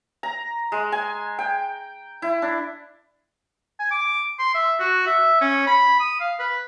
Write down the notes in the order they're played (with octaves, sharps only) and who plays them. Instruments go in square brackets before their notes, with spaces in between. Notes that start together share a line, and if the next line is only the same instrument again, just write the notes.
[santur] A#5
G#3
G#5
G5
E4
D4
[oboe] G#5
D6
C6
E5
F#4
E5
C#4
B5
D#6
F5
B4